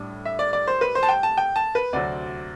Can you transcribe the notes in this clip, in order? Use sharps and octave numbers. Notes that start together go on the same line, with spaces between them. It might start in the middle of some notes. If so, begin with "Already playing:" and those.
Already playing: A2 G3 D4
E5
D5
D5
C5
B4
C5
A5
G5
A5
G5
A5
B4
D2 C3 F#3 C4 D5